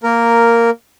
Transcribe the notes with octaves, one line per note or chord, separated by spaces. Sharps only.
A#3 A#4